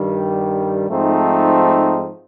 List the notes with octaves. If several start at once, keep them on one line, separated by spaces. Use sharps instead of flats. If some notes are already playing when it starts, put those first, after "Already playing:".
Already playing: G2 D#3 G3
G#2 F3 A3 C4 D#4